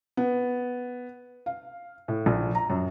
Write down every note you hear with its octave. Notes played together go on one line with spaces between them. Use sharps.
B3
F5
A2
A#1
A#5
F#2